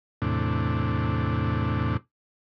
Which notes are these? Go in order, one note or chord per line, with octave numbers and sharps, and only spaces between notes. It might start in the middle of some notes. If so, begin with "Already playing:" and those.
E2 A2 C3 D4